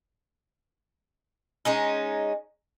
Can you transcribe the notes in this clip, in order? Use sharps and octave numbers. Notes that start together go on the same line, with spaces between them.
G#3 C#4 D#4